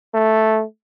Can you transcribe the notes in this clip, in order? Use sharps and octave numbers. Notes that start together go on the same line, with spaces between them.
A3